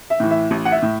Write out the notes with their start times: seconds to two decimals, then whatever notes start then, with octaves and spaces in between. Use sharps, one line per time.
0.10 E5
0.20 A2 E3
0.31 E5
0.51 A1
0.65 F#5
0.72 E5
0.82 A2